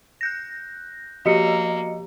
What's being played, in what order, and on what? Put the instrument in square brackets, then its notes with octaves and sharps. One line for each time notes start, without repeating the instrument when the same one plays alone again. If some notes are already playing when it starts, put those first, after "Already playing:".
[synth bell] F#6 G6 A#6
[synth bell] F3 G4 [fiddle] A#3 [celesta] F#4 C#7 [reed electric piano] D#5